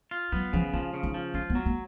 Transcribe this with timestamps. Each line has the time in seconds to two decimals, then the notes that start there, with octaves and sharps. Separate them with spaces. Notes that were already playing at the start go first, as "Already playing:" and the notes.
0.11 F4
0.32 F#3 B3
0.53 C#3 F3
0.73 F3 C#4
0.94 C#3
1.03 D#4
1.14 F3
1.34 C#4 F4
1.50 B3
1.55 F#3
1.66 A#3